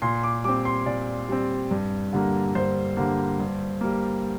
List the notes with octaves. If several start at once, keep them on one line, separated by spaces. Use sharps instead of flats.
A#2 C6
D6
G3 C4 D6
C6
A#2 D5
G3 C4
G2
D3 G3 A#3
G2 C5
D3 G3 A#3
G2
G3 A#3